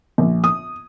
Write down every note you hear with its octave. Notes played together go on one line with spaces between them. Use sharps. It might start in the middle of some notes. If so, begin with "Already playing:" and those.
A#1
D#6